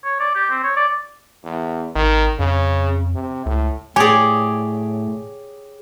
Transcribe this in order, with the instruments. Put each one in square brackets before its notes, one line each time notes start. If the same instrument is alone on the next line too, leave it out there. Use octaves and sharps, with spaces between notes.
[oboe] C#5
D5
G4
C4
C#5
D5
[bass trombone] E2
[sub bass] G#1 [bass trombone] D#3
[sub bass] F2 [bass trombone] C#3
[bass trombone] C3
[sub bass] C#2 [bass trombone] A2
[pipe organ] A2 [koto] G4 D5 [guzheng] G#4 C#5 [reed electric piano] G#5